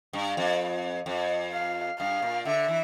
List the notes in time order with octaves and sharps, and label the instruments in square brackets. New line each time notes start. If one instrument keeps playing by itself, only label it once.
[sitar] G2
F2
F2
[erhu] F5
[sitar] G2 [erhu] F5
[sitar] A#2
[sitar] D3 [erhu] E5
[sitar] E3